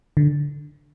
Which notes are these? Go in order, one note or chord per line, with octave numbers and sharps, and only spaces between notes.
D3